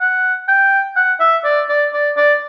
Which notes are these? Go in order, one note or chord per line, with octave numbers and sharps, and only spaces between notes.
F#5
G5
F#5
E5
D5
D5
D5
D5